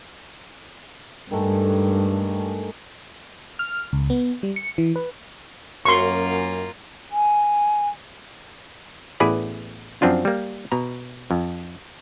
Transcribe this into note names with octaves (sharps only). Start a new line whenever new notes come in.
G2 D#3 G#3 A3
F6
C#2
B3
G3
C#7
E3
B4
F#2 A#3 F4 C6 C#6
G#5
A1 B3 E4 G#4 B4 D5
F#2 F3 C4 D4 F4
G3 A#3
B2 A#5
F2